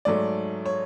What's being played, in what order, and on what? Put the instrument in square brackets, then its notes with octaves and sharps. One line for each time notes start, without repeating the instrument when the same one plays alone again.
[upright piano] G#2 F#3 A3 D5
C#5